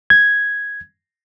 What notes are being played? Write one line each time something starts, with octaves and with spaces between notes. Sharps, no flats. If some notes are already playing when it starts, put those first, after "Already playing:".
G#6